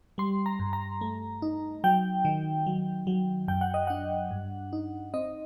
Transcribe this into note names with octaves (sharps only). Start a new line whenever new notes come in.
G3 C6
A#5
G2
A#5
A3
D#4
F#3 G5
D#3
F#3
F#3
F#2 G5
F#5
D#5
D4 F#5
G2
D#4
C4 D#5